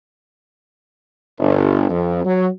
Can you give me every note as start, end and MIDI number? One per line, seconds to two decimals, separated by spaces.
1.38 1.86 31
1.89 2.21 41
2.24 2.48 54